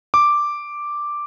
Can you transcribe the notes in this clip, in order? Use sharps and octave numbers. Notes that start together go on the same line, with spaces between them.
D6